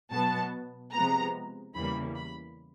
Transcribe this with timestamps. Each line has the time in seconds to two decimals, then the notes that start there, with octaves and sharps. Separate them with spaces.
0.11 B2 F#3 B3 A5
0.93 C3 F3 G#3 B3 A#5
1.75 E2 C#3 E3 G3 A#3 B5
2.15 B5